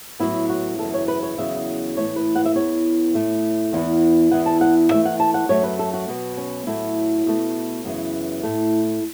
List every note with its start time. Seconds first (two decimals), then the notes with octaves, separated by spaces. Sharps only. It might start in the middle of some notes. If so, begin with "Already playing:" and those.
0.20 A2 F#3 B3 E4
0.49 F#4
0.79 F#2 C#3 E3 A4
0.94 C#5
1.08 B4
1.23 C#5
1.38 E2 C#3 F#3 E5
1.97 A2 E3 A3 C#5
2.16 B4
2.36 F#5
2.46 E5
2.55 E2 E3 B3 C#5
3.14 A2 A3
3.73 E2 E3 B3
4.31 E2 E3 B3 F#5
4.46 A5
4.61 F#5
4.90 A2 E3 A3 E5
5.05 F#5
5.20 A5
5.34 F#5
5.49 F#2 F#3 A3 C#5
5.63 B4
5.79 A4
5.94 F#4
6.08 B2 F#3 B3
6.38 C#4
6.66 A2 F#3 A3 E4
7.26 B2 A3
7.84 F#2 C#3 E3 B3
8.43 A2 A3